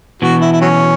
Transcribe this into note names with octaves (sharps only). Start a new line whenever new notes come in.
B2 E3 F#4
E4
E4
F#3 C#4